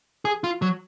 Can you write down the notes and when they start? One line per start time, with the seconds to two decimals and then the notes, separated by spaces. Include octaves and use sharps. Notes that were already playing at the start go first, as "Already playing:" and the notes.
0.25 G#4
0.44 F4
0.62 F#3